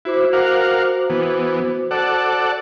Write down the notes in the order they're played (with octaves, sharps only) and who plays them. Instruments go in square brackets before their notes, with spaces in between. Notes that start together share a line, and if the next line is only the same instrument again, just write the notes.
[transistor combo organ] E4 [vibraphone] F#4 C5 D6
[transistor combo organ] A#4 F5 F#5
E3 B3
A4 D5 F#5